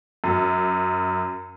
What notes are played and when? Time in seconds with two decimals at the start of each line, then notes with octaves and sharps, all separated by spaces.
0.24 F#2